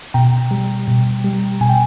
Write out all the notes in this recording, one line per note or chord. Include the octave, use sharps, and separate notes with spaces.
B2 G5 A#5
G3
B2
G3
B2 G#5
G5